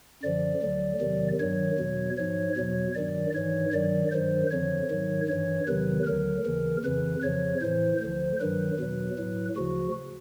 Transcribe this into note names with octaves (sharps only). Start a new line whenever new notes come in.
F#2 D3 F3 D5
D2 D3 F#3
E2 C3 D#3 F#3
G2 D#3 F#3 C#5
E2 B2 F#3
G#2 F3 C#5
E2 B2 F#3 C#5
G2 D#3 F#3 D5
G#2 E3 C#5
G2 D#3 F#3 D5
G2 D#3 F#3 C5
F2 D3 F3 C#5
G#2 D#3 F#3
G2 E3 C#5
E2 C3 D#3 F#3 B4
D2 D3 F#3 A#4
D#2 C#3 E3
F2 C#3 E3 B4
F2 C#3 F3 C#5
A2 E3 C5
D2 D3 F3 C5
G2 D#3 F#3 B4
E2 B2 F#3
A2 F#3
D2 C#3 F3 F#4